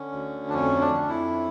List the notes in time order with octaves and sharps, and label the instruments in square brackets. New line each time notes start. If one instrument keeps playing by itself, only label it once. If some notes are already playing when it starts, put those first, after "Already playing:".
Already playing: [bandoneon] D3 C#4
D2
D4
F2 C#4
D4
F2
E4